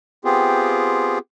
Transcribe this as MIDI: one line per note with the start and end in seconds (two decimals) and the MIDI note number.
0.25 1.18 59
0.25 1.18 60
0.25 1.18 65
0.25 1.18 67
0.25 1.18 68